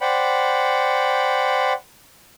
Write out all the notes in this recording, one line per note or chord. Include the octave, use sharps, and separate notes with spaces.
C5 D5 F#5 G5 B5